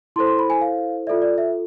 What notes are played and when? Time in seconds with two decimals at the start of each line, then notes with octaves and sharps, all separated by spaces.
0.16 E4 C6
0.18 A4 C5
0.27 C6
0.39 B5
0.50 G#5
0.61 F5
1.07 F4 A4 D5 E5
1.22 D5
1.38 E5